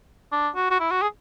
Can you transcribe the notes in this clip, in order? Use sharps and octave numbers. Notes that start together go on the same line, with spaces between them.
D4
F#4
F#4
E4
F#4
G#4